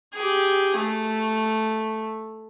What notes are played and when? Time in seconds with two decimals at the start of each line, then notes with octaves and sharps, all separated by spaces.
0.14 G4 G#4
0.76 A3